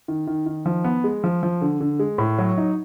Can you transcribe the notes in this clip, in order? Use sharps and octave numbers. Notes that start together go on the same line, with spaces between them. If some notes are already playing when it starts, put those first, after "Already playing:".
D#3
D#3
D#3
F3
B3
G#3
F3
F3
D3
D3
G#3
A2
F#3
D#4